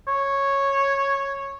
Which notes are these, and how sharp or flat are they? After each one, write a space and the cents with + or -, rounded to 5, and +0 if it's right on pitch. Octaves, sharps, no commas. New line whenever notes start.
C#5 -5